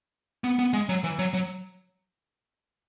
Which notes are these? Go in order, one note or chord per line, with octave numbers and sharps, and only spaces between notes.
B3
B3
G#3
F#3
E3
F#3
F#3